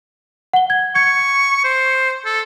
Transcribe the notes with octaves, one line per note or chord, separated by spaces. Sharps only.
F#5 G7
G#6
C#6 G#6 C#7
C5
A4